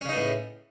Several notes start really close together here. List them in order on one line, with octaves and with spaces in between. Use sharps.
C#4 C#3 D#4 B3 A2